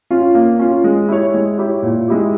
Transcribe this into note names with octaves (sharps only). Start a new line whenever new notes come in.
C#4 F4
A#3
C#4 F4
G#3
E4 G4 C#5
G#3
E4 G4 C#5
A#2
G#3 E4 G4